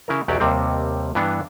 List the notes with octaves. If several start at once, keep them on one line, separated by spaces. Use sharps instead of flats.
C#3 E4 A#4
B1 E2 F#3 G4 D5
D#2 C3 G3 C4
G2 E3 B3 D4